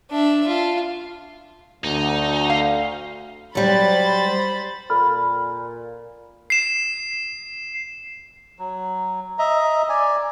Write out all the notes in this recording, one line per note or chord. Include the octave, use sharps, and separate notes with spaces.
D4 E5
F4
D2 D#4
F5
F#3 G3 C5 B5 A6
A#2 A4 B5 F6
C7 E7
F#3
D#5 E5 A#5
D5 G#5